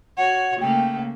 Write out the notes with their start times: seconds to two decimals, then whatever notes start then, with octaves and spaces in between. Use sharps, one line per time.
0.17 F#4 C#5 F#5
0.61 C#3 A3 A#3 G5